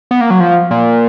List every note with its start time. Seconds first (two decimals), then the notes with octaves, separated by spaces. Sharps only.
0.11 B3
0.21 A#3
0.30 F#3
0.40 F3
0.71 A#2